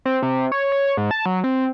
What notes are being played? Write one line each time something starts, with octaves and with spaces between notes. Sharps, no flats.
C4
C3
C#5
C#5
G#2
A5
F#3
C4